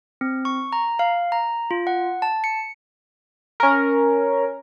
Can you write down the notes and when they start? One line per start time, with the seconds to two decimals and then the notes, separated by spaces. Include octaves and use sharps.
0.21 C4
0.45 C#6
0.73 A#5
0.99 F5
1.32 A#5
1.71 F4
1.87 F#5
2.22 A5
2.44 C#7
3.60 C#4 A#4